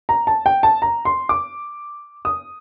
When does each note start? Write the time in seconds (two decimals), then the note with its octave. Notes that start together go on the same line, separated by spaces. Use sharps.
0.09 A#5
0.27 A5
0.46 G5
0.63 A5
0.82 A#5
1.05 C6
1.29 D6
2.25 D#6